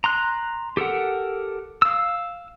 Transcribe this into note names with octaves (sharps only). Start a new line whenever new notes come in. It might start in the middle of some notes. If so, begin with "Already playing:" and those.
A#5 C6 F#6
G4 A4 A#4 F#5
F5 E6